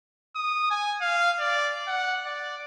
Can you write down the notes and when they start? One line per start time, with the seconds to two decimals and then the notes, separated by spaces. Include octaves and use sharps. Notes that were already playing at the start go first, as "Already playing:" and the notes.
0.36 D#6
0.71 G#5
1.01 F5
1.40 D5
1.88 F#5
2.26 D5